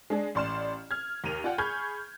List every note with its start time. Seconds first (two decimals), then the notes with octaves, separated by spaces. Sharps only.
0.10 G#3 D4 G#4
0.35 A1 D5 C6 F6 E7
0.91 F6 G#6
1.24 D#2 A#4 D#7 F7
1.44 F4 D5 F#5 G5
1.58 G#4 B5 C#6 F6 G6 G#6